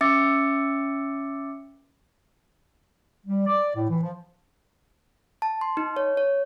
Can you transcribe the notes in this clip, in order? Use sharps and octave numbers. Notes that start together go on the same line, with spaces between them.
C#4 E5 D6 E6 A6 C#7
G3
D5
A2
E3
F3
A5
C6
D#4
C#5
C#5